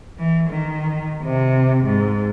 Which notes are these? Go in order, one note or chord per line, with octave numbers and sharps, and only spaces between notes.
E3
D#3
C3
G#2